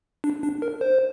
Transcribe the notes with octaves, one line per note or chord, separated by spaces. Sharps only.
D4
D4
A#4
C5